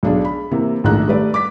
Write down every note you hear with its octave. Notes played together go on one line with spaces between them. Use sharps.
B1 D4 G#4
B5
C3 E3 A#3
A#1 G#2 D#3 A3 A#5 F#6
G3 A3 B4 D5
D6 B6